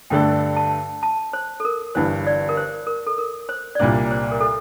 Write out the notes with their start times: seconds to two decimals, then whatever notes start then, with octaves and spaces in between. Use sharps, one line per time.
0.10 G2 D3 A3 D4 A4 G5
0.56 A5
1.03 A5
1.33 C5
1.60 A4
1.65 A#4
1.95 G1 G2 E3 C5
2.26 D5
2.49 A#4
2.57 C5
2.87 A#4
3.07 A4
3.18 A#4
3.49 C5
3.75 D5
3.80 C2 A#2 G3 A#3 D4 C5
4.11 C5
4.31 A#4
4.40 A4